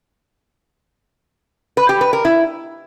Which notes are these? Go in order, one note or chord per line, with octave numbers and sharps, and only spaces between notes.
B4
G4
B4
A#4
E4